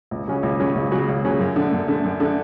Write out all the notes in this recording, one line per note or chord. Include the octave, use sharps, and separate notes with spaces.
C#2
C#3 F#3 C#4 F#4
C#2
C#3 F#3 C#4 F#4
C#2
C#3 F#3 C#4 F#4
C#2
C#3 F#3 C#4 F#4
F#2
D3 A3
F#2
D3 A3
F#2
D3 A3